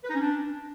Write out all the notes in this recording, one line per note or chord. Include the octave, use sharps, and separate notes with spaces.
B4
D#4
C#4
D4